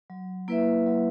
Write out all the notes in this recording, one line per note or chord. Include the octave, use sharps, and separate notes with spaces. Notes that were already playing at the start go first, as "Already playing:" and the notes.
F#3
A#3 E4 B4 E5
F#3